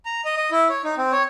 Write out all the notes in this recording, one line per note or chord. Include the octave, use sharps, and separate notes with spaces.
A#5
D#5
D#5
E4
C#5
D#4
C4
C#5